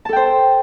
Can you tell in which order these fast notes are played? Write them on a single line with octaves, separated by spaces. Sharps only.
A5 A4 G5 C5